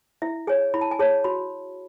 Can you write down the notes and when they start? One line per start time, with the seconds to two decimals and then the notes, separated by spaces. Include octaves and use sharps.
0.22 E4 E5
0.47 G#4 C#5 G#5
0.74 E4 B5
0.81 A5
0.91 G#5
0.99 G#4 C#5 A5
1.24 F#4 B5